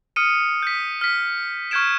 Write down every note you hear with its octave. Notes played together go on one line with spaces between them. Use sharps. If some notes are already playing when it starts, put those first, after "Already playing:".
D#6 F6 C#7 D#7
G6 B6
F6 B6
C#6 F6 G6 G#6 D7 E7